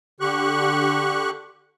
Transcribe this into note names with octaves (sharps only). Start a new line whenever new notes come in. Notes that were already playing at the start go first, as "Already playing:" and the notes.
D3 G4 C#6 F#6